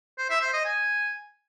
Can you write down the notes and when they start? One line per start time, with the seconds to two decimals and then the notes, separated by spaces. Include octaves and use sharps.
0.18 C5
0.30 E5
0.42 C5
0.53 D#5
0.65 G#5